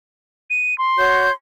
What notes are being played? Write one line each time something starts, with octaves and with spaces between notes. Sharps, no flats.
D#7
C6
F#4 C#5 G6